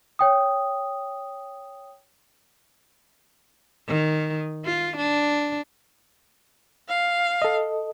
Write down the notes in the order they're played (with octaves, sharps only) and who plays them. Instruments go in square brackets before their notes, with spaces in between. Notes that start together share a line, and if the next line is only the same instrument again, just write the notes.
[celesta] C#5 G5 D#6
[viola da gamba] D#3
F4
D4
[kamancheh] F5
[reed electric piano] A4 D#5